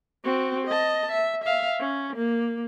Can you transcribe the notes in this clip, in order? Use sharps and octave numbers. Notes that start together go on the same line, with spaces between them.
C4 F#4
D#5 A5
E5
E5 F5
C#4
A#3